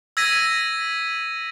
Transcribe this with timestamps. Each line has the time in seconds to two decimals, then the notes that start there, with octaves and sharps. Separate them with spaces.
0.17 E6 G#6 A#6 B6 D#7